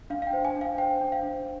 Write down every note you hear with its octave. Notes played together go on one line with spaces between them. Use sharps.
D4 F5
F5
G5
C5
G#5
D4
F5
C5 G5
D4
F5
D4